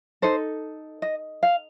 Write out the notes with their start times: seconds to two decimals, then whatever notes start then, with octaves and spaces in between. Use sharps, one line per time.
0.22 D#4 A4 C5
1.02 D#5
1.43 F5